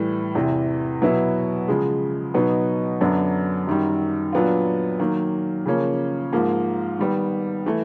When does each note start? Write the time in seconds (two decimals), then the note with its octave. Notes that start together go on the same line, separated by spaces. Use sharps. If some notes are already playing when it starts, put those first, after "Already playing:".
Already playing: A2 E3 G3
0.35 E2 C3 E3
1.02 B2 F#3 B3 E4
1.68 C#3 F3 G#3
2.34 B2 F#3 B3 D#4
3.01 F#2 D3 F#3 B3 D4
3.67 F#2 D#3 G3
4.33 A#2 F#3 B3 D4 F4
5.00 D#3 F#3 A#3
5.66 C#3 F3 A#3 C#4
6.33 G#2 F3 A#3
6.99 D#3 G3 B3
7.66 E3 A3